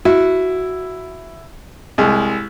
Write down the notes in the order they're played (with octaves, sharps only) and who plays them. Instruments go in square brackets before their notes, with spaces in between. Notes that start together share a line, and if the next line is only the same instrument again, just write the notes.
[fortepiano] E4 [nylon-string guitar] F#4
[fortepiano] C2 G#3